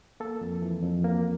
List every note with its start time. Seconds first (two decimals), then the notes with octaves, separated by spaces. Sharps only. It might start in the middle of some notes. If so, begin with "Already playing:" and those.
0.20 A#3 A4
0.41 F2
0.62 E3
0.83 F2
1.04 A#3